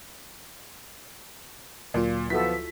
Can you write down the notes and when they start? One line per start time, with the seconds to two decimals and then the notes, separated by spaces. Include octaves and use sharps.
1.94 D2 A#2 F#3 F4
2.30 F3 B3 E4 F#4 A4 B6